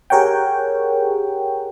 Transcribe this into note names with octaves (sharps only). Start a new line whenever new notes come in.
G4 G#4 A#4 C#5 F#5 G5